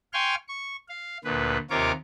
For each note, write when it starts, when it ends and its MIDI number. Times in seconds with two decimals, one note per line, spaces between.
0.13 0.35 77
0.13 0.35 79
0.13 0.35 80
0.13 0.35 84
0.13 0.35 85
0.13 0.35 89
0.48 0.76 85
0.89 1.18 77
1.24 1.58 38
1.24 1.58 46
1.24 1.58 71
1.70 1.92 39
1.70 1.92 48
1.70 1.92 65
1.70 1.92 70
1.70 1.92 73
1.70 1.92 86